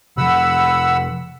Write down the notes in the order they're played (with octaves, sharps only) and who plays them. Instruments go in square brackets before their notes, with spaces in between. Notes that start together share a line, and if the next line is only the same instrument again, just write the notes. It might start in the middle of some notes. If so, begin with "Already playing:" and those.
[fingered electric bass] C3 F3 [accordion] F#5 B5 E6